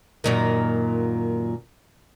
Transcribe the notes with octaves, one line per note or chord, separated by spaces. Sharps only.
F#2 A#2 D#3